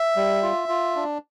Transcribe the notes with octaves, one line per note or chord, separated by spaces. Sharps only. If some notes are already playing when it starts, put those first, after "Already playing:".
Already playing: E5
G3
F4
F4
D4